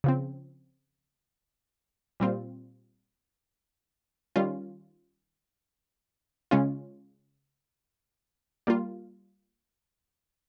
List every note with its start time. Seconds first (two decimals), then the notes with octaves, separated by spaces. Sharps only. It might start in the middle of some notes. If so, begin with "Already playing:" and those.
0.04 C#3 F3 C4
2.20 A#2 G3 C4 F4
4.36 D#3 G3 C#4 F4
6.51 C#3 G#3 C#4 F4
8.67 G3 A#3 F4